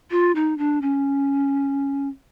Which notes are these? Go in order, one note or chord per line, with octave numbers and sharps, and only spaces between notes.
F4
D#4
D4
C#4